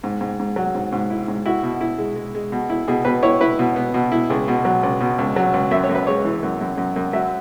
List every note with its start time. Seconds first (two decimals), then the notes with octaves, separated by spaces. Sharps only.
0.04 G#2
0.21 G#2
0.39 G#2
0.56 F#3
0.75 G#2
0.92 G#2
1.10 E4
1.28 G#2
1.46 E4 F#4
1.63 B2
1.81 E4
1.98 G#3
2.16 G#3
2.35 G#3
2.52 B2
2.70 E4
2.88 B2 G#4
3.05 B2 B4
3.23 E4 C#5
3.41 E4 B4
3.59 B2
3.76 B3
3.94 B2
4.12 E4
4.30 C#2 G#4
4.48 B2
4.65 F#3
4.83 C#2
5.00 B2
5.18 C#2
5.36 F#3
5.53 C#2
5.71 F#2 E5
5.84 C#5
5.89 F#2
5.95 B4
6.07 G#3 C#5
6.25 E3
6.43 F#2
6.61 F#2
6.78 F#2
6.96 F#2
7.13 F#3 E5